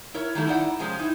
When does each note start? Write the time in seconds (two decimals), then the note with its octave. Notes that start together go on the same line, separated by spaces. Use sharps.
0.14 E4 A#4 C#5
0.35 D#3 G3 A3 E4
0.47 D#4 E4 D5 F#5
0.79 C3 F3 G#3 C4 C#4
0.99 D#4 E4